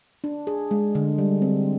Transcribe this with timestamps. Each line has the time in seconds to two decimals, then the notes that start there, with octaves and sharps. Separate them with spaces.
0.24 D4
0.47 G#4
0.71 G#3
0.95 D3
1.18 G3
1.42 C4